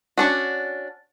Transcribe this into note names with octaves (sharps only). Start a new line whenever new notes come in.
C#4 D4 F#4